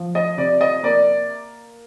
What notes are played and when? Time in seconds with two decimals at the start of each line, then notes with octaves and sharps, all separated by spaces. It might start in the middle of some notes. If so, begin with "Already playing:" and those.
Already playing: F3
0.15 D#5
0.37 C3 D5
0.61 D#5
0.83 A#3 D5